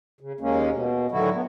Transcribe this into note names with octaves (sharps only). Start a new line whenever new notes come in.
C#3
D#2 G#3 A#3 C#4
B2
A2 D3 D#3 F#3 E4 F#4
B3